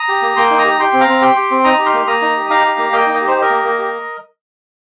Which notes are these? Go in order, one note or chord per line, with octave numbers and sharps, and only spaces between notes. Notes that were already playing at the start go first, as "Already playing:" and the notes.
Already playing: A#5 D#6
G4
A#3
A#3 G5 C6
D#4
A#5 D#6
G4
G4 G5 C6
C4
F5 A#5
C4
G4 G5 C6
G4
C4
D#4 A#5 D#6
G4
C6 F6
A#3
A#3 A#5 D#6
D#4
G4
D#4 F5 A#5
G4
A#3
A#3 D#5 G5
D#4
D#5
G4
C5
G4
A#4 D#5
A#3
A#3
G4